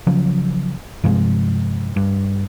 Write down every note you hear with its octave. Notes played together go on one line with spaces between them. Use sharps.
C#3 F3 F#3
G2 C3 F3 G#3
G2